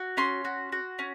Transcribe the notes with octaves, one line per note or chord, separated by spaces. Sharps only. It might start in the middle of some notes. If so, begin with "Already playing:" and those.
Already playing: F#4
C#4 C6
F#4
F#4
C#4